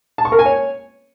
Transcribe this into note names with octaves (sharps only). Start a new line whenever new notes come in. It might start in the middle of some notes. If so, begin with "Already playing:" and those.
A5
C#6
A#4
G#5
C#5